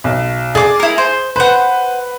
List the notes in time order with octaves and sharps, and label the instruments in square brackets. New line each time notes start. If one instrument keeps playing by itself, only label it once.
[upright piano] B1
[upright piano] G#4 [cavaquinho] D5 D6
[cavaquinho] E4 A#4
C5
[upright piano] B4 [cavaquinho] C5 F#5